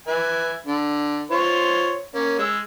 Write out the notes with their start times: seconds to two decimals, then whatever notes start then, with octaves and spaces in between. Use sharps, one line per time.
0.07 B4 E5 G#5
0.66 D3
1.31 F4 C5 C#5
2.15 A#3 C#4
2.39 G#3 E6